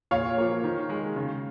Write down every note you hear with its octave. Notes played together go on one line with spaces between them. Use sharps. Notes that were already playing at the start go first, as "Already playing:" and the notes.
A#2 C#5 F5
F3 A#3
D#3
G#3
C#3